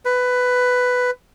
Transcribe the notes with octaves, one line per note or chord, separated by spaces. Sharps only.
B4